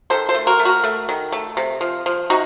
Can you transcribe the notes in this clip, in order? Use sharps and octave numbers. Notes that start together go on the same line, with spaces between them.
D#3 A4 C5
A4 C5
A3
F#4 A#4
A3
F#4 A#4
A3
D#3
A3
C3
F3
F3
C3 D#4 F#4